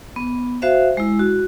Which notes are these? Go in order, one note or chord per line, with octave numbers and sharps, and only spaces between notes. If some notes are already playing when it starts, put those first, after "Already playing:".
B3
F#4 C5 E5 F5
G#3 E4
F#4